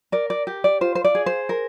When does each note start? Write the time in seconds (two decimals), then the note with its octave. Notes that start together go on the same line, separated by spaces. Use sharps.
0.12 A#4 D5
0.30 D5
0.47 G4
0.64 D5
0.81 F4 C5
0.95 C5
1.05 D5
1.15 G#4
1.26 C5
1.49 A#4